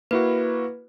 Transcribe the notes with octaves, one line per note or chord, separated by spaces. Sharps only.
A#3 E4 F#4 B4